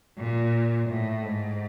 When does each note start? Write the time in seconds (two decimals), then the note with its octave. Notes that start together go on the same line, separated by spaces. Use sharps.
0.18 A#2
0.89 A2
1.24 G#2